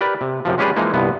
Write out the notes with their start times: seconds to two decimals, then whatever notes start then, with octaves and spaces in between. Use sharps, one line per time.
0.01 G4 A#4 B4 D5
0.21 C3
0.45 F#2 C3 F3
0.58 G#3 C#4 G4 G#4 B4 D5
0.76 E3 F3 G#3 A#3 D#4
0.94 C2 G2 B3